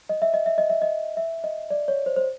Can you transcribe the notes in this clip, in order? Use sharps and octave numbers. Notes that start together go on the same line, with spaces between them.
D#5
E5
D#5
E5
D#5
E5
D#5
E5
D#5
D5
C#5
C5
C5